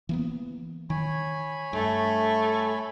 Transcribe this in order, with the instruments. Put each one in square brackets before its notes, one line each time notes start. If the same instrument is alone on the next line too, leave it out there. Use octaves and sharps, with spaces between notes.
[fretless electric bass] E3 A#3 B3
[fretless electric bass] D#3 [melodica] C#5 G#5 B5
[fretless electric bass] G2 [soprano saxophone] A3